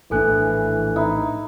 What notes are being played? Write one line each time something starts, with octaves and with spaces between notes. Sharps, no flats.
A#1 A2 E3 D4 A4 G#5 F#6
D#4 E4